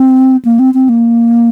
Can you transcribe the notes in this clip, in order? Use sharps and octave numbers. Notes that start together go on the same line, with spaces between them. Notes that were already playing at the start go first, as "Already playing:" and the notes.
Already playing: C4
A#3
C4
C4
A#3